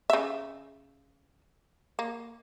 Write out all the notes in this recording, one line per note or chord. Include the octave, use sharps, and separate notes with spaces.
C#3 E5
A#3